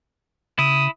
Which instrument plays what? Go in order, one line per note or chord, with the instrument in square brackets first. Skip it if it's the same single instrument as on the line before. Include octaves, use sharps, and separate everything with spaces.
[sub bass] C#3 [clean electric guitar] E4 [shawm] D#6